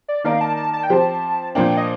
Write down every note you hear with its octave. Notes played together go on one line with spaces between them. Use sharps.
D5
D#3 A#3 D#4 A#4 D5 F5
A5
A5
A5
G5
F3 C4 G4 C5 A5
A#2 F3 A#3 D4 G5
D#5